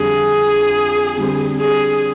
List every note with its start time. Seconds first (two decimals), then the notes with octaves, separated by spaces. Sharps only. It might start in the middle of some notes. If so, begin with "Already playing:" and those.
Already playing: F2 D3 G3 D4 G#4
1.17 D3 G3 C4
1.60 G#4